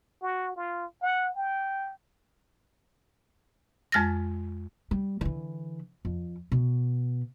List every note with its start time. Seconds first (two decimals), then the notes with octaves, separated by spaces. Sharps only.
0.23 F#4
0.56 F4
1.02 F#5
1.36 G5
3.92 F2 G#3 F6 A6 A#6
4.91 G3
5.21 D3 E3
6.05 F2
6.52 B2